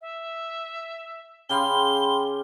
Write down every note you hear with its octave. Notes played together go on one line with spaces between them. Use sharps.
E5
C#3 G4 F5 G5 B5 C6 G7